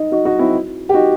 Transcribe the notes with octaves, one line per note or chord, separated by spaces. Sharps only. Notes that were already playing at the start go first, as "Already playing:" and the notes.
Already playing: D#4
D#4 F#4
D#4 F#4
C4 E4
G4
D#4 F#4